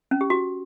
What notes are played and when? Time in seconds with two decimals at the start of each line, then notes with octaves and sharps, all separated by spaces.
0.11 C#4
0.21 G4
0.30 F#4